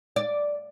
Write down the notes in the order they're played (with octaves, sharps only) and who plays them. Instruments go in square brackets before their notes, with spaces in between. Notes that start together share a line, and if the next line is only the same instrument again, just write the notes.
[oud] D5